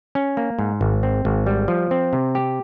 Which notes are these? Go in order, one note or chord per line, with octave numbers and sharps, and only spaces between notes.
C#4
A#3
G#2
G#1
C4
G#1
G3
F3
C4
C3
G4